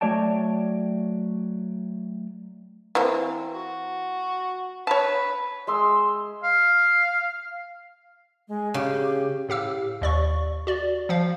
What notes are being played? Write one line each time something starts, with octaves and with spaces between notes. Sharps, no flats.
F#3 A3 C#5 D5 G5 A5
E3 A#3 C4
F#4
B4 C#5 A5
G#3 C6 E6
F5
G#3
C#3 G4
A2 G4 F5 E6
D#2 D5 C#6
F#4 D5
F3 F5